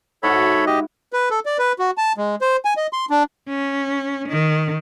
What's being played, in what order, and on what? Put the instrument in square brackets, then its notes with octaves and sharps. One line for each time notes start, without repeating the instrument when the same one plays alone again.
[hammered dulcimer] G#2 E4 F#4 [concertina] A4 C#5 B5
[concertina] G4 D#5
[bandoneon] B4
A4
D5
B4
F#4
A5
G#3
C5
G#5
D#5
C6
D4
[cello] C#4
D#3